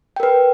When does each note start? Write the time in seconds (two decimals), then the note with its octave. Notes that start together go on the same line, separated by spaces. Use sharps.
0.16 G5
0.20 A#4
0.23 B4